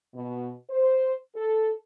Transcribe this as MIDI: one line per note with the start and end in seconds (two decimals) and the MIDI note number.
0.14 0.50 47
0.70 1.14 72
1.35 1.72 69